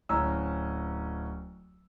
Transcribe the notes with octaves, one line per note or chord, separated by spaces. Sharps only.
D1 C#4 A#5 E6